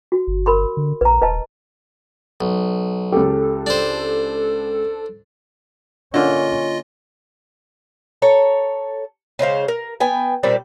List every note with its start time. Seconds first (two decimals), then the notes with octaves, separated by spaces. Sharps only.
0.12 F#4
0.27 G1
0.46 A#4 B5 C6
0.77 D3
1.01 A#1 B4 A#5
1.22 D#1 B4 D#5 A5
2.41 B1
3.12 C#2 C#4 G4 A4
3.67 D4 C5
6.14 D3 A#3 C#4 F4 D#5
8.22 A4 C#5 A#5
9.39 C#3 G#3 C5 F5
9.68 A#4
10.00 B3 G5 G#5
10.43 A#2 G3 C4 D5